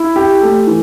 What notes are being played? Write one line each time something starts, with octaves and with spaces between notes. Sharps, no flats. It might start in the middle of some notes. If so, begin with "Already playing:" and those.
Already playing: E4
G4
A3
E3